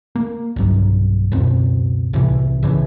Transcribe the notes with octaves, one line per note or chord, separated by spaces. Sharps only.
A#3
B1 G2 F#3
C#2 F#2 B2 C4
C2 A2 C3 E3
A#1 C#3 E3